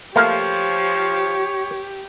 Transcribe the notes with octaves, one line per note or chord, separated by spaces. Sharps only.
F3 A3 A#3 G4 C#5 F5